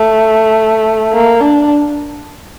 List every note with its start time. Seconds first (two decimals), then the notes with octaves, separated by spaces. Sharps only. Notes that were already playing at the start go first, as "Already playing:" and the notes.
Already playing: A3
1.13 A#3
1.41 D4